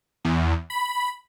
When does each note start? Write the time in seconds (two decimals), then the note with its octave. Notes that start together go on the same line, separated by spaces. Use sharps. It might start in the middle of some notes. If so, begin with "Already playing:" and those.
0.25 E2
0.70 B5